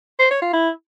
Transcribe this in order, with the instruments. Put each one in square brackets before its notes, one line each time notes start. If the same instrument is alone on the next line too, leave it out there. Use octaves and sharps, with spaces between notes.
[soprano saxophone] C5
C#5
F4
E4